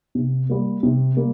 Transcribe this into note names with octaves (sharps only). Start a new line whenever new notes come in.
C3
G3 A#3
C3
G3 A#3